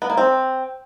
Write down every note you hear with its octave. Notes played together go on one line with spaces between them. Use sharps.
B3
A#3
C4